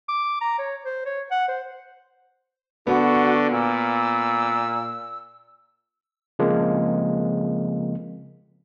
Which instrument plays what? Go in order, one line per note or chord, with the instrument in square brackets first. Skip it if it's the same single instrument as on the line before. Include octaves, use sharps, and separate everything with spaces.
[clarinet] D6
A#5
C#5
C5
C#5
F#5
C5
[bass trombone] D3 [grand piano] B3 [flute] F#4
[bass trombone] A#2 [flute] E6
[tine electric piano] C#3 F3 G#3 A#3 C4